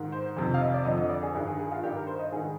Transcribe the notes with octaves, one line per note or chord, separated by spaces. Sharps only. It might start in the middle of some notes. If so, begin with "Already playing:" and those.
Already playing: G#2 D#3
C5
F2 C3 D#3 C5
F5
D#5
D5
F2 D3 D#5
D#5
D5
G#4
G2 D#3 G#4
G#4
G#4
F4
G2 D#3 G4
A#4
C5
D#5
G#2 D#3 G#4